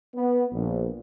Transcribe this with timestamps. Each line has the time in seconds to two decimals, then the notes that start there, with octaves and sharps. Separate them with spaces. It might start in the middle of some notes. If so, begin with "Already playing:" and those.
0.15 B3
0.52 A#1